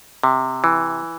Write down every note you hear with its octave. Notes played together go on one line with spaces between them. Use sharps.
C3
E3